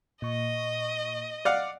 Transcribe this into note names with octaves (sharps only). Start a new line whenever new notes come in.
A#2 D#5 C#6
D5 F5 F#5